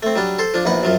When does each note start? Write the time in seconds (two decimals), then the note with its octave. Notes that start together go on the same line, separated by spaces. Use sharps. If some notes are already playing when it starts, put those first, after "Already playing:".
0.03 A3 C4
0.16 F#3 G3 D4
0.39 A4 C5
0.54 F3 D4
0.65 A#1 E2 D#4 B4 F#5
0.83 F#2 F3 F#3